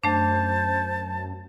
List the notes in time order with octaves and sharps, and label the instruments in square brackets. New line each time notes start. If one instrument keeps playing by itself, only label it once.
[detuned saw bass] F#2 [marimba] A3 D4 [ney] C5 [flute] A5